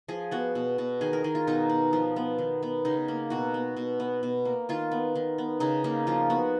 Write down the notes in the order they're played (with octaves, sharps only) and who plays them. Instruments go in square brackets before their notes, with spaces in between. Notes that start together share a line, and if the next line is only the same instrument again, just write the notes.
[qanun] F3 G#4
B3 F#4
B2
B2
D#3 G#4
A#4
D#3 G#4
F4
B2 D#4
B2
F3
B3
D#3
B3
C#3 D#4
A#3
B2 F#4
B3
B2
B3
B2
A#3
D#3 F4
B3
D#3
B3
C#3 D#4
A#3 D#4
F3 F4
B3 F#4